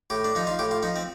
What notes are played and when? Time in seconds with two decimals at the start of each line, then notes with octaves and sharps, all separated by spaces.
0.10 A2 G4
0.24 D4
0.35 F3 D#4
0.47 F4
0.59 A2 G4
0.71 F4
0.83 F3 D#4
0.96 C4